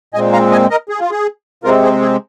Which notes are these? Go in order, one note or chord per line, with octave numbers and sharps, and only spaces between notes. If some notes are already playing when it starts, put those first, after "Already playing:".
A#2 G#3 C4 D#5 G#5
F5 A#5
D#5 G#5
A#4 D#5
G#4
F4
G#4
C3 G#3 C4 F4 A#4
G#4 C5
G#4